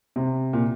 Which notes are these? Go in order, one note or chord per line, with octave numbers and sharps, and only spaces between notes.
C3
A#2